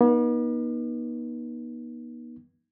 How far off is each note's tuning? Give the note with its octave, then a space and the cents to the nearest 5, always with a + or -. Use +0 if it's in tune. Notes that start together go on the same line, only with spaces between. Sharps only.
B3 -45 D#4 +0